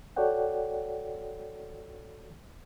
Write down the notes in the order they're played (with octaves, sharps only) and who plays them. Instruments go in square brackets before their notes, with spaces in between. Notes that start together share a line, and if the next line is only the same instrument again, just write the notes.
[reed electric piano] F#4 A4 C#5 D5 F#5 G5